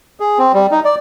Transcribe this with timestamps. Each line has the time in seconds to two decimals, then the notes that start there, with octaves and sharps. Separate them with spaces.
0.20 G#4
0.38 C4
0.54 G3
0.71 D#4
0.85 D5